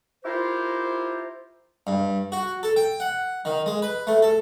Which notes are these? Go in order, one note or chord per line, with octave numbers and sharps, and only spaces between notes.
E4 F4 G4 A#4 C5
G2
F#4
A4
G5
F#5
D#3
G#3
B4
A3
A4